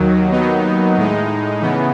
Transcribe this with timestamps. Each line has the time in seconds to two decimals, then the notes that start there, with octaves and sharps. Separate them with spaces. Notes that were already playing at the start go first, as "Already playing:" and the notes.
Already playing: D#2 D#3 F#3
0.32 D#2 D#3 F#3 B3 D#4
0.97 A2 G#3 D#4
1.61 C#3 E3 B3